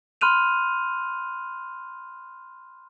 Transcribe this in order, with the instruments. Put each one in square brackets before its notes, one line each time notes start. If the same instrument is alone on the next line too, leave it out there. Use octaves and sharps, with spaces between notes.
[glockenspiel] B5 C6 F6 F#6 D#7 F7